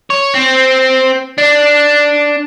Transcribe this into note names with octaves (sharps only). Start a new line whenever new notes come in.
C#5
C4
D4